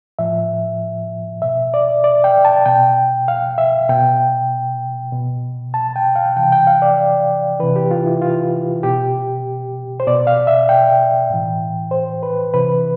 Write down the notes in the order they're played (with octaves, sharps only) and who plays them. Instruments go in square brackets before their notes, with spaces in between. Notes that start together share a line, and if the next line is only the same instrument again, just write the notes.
[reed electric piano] A2 F3 E5
B2 E5
D5
D5
G5
A5
B2 G5
F5
E5
B2 G5
B2
A5
G5
F5
C3 E3 G5
G5
F5
D5
C3 E3 B4
G4
F4
E4
F4
B2 G4
C5
B2 D5
F5
E5
G5
A2 E3
C5
B4
C3 E3 B4